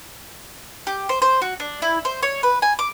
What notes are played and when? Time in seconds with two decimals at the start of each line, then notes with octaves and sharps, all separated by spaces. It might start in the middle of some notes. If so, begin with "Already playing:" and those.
0.87 G4
1.09 C5
1.22 C5
1.42 F#4
1.60 D4
1.82 E4
2.05 C5
2.23 C#5
2.43 B4
2.62 G#5
2.79 D6